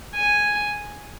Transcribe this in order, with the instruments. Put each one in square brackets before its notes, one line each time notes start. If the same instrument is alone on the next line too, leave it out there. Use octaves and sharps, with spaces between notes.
[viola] G#5